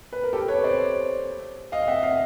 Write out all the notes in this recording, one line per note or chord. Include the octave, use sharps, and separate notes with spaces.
B4
A#4
G4 A4
B4 C#5
C5 D5
D#5 F5
F5
E5 F#5
D#5 F5